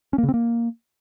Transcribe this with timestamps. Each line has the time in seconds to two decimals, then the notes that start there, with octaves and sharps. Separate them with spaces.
0.13 C#4
0.18 A#3
0.23 C#3
0.29 C4
0.34 A#3